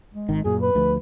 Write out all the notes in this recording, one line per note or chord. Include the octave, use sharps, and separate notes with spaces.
G#3
G#1 D#3
F#2 A#2 G#4
B4
D2 F3 A3